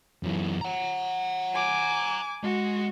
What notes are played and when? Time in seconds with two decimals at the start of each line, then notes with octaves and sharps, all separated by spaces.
0.23 F#2 E3
0.61 F#5 A#5
1.54 G#5 D6
2.44 G#3 F#4